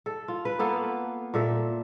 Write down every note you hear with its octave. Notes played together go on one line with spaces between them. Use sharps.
A4
F4
B4
A#3 B3 A4 F5
A#2 A4 E5